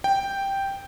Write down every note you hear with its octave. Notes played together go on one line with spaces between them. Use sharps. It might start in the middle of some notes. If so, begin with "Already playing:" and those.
G5